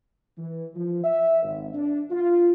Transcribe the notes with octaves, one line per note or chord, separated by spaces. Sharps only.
E3
F3
E5
G#1
D4
F4